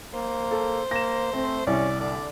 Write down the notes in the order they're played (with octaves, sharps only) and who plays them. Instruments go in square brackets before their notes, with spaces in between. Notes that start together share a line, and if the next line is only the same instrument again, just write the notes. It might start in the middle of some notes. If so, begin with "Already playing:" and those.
[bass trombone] A#3 [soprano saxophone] C5
[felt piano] A4
[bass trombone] A#3 [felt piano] A#6 E7
[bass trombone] A3 [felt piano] C4
[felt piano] C2 [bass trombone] C#4 [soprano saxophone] D5
[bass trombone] D3 [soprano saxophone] D5